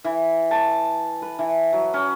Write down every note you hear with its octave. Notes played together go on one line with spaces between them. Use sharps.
E3
A5
B4
E3
F#3
C#4